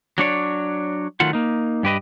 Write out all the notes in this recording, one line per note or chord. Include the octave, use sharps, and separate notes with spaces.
F#3 D4 C#5 D5
D#3 F#3 A3 F4 F#5
A#3 D#4
G2 G4 B4 D#5